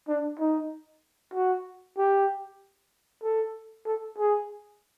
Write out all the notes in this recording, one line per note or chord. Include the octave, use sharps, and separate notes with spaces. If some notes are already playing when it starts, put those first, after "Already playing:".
D4
D#4
F#4
G4
A4
A4
G#4